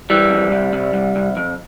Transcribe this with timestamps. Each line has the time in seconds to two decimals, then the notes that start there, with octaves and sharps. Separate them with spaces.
0.10 E3 G3
0.30 F2
0.52 C2
0.73 C2
0.94 C2
1.16 C2
1.37 F2